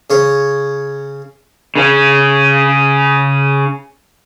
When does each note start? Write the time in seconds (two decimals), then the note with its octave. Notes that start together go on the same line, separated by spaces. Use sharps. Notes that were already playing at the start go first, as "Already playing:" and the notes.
0.10 C#3 C#5
1.75 C#3 C#4